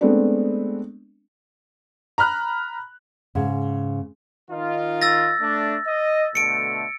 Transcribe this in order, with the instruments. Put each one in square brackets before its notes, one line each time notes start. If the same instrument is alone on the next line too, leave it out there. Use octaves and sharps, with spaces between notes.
[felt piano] G#3 A3 B3 C4 D4
[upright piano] A#5 B5 F6 F#6
[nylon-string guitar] G#2 C#3
[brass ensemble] D#3 D#4 F4
[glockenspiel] E6 A6 A#6
[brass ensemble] A3 D4
D#5
[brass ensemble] B2 D3 A3 [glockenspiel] C#7 D7